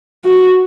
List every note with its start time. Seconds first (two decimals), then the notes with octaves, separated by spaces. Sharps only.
0.25 F#4